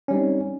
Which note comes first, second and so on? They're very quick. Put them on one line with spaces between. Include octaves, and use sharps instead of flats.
C#4 G3 D#4 C4